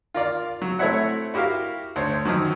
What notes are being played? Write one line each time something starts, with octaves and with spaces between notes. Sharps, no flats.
F4 A#4 D5 F5
F#3
A3 C4 E4 C#5 E5 F#5
E4 F#4 G4 A#4 F5
D2 C5 C#5
F#2 D#3 F3 F#3